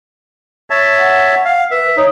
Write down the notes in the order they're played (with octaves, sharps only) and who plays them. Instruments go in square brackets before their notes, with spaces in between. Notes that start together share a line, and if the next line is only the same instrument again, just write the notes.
[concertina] C#5 E5 A5
[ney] F#5
[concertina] F5
[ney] B4 [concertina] E5
[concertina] D#4 [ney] C#5